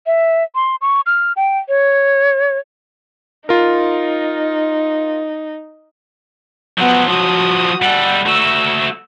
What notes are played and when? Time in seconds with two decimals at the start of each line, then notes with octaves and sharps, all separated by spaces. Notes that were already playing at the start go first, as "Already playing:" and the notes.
0.06 E5
0.55 C6
0.81 C#6
1.06 F6
1.36 G5
1.69 C#5
3.49 D#4 F4 A#4
6.80 F3 F#3 B3 F#5
7.09 F#4 D#6
7.82 G3 A4 F#5
8.26 A3 F#4 E6